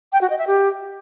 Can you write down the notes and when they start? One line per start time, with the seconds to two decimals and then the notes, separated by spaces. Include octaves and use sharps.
0.13 G5
0.21 F#4
0.30 D#5
0.39 E5
0.47 G4